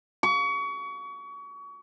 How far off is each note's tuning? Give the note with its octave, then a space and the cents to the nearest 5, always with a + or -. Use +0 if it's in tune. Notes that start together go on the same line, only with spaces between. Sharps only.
C#6 +30